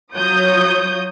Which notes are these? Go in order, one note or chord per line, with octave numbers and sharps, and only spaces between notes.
F#3 F4 C#5 D#6 G6